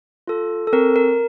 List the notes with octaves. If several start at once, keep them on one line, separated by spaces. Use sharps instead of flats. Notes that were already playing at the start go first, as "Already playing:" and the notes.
F4 A4
A4
C4 A#4
A#4